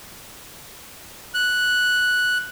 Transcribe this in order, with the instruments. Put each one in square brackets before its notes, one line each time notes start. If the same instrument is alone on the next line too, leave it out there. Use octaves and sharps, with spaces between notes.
[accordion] F#6